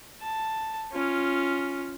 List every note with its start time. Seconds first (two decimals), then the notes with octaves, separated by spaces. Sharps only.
0.22 A5
0.92 C#4 F4